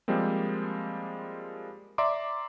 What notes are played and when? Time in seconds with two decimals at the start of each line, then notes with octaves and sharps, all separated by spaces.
0.08 F3 G3 G#3 A#3 C4
1.98 D5 E5 A#5 C6 D6